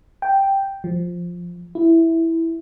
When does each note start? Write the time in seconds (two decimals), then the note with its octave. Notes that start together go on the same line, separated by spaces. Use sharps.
0.22 G5
0.84 F3
1.75 E4